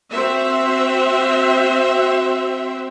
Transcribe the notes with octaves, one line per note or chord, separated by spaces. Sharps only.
C4 F#4 C5 E5